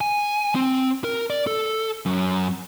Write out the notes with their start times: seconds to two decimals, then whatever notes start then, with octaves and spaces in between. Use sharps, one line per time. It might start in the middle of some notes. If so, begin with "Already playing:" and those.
0.01 G#5
0.55 C4
1.04 A#4
1.30 D5
1.47 A4
2.06 F#2